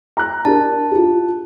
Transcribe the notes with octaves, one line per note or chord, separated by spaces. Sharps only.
A#5 F#6
D4 G4 A#4 A5
F4 G4